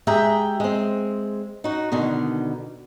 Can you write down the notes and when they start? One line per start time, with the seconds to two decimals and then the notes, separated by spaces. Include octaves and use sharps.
0.07 G#3 G4 G#4 E5 G5 A#5
0.60 G#3 C4
1.64 D#4 F#4
1.92 B2 D3 D#3